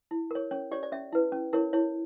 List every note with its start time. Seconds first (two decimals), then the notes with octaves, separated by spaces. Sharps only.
0.11 E4
0.31 A#4 C#5
0.51 C#4 C#5
0.71 G4 C#5 D5
0.83 D5
0.92 C#4 E5
1.13 E4 B4
1.32 C#4
1.53 E4 A#4 C#5
1.73 E4 C#5